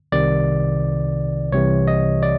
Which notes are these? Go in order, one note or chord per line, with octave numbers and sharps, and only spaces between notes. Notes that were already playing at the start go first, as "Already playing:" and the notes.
C2 C3 D#3 D5
C2 C3 E3 C#5
D#5
D5